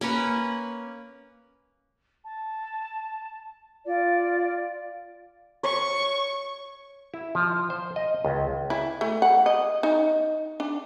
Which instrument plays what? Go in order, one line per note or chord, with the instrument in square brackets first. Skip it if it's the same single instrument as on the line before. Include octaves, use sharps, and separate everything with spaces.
[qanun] A#3 C#4 B4 C#5
[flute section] A5
F4 D5
[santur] C#5 [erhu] C#6
[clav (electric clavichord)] E4
F3
C5
D#5
C#2
[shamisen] E4
A3
F#5
D#5
D#4
D4